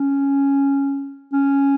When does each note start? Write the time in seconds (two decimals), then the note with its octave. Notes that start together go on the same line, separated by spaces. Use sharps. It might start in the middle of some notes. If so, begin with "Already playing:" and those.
Already playing: C#4
1.33 C#4